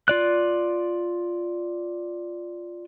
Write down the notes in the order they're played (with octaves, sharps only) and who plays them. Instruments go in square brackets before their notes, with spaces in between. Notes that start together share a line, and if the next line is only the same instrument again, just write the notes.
[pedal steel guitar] F4 D5 F#6